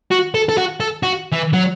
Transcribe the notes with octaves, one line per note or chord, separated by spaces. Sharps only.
F#4
A4
A4
F#4
A4
F#4
E3
F#3